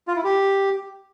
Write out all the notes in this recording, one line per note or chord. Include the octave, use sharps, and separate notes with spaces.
F4
E4
G4